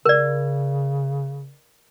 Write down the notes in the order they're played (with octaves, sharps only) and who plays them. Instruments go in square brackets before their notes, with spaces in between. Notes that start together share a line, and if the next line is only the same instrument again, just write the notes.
[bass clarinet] C#3 [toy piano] A#4 D5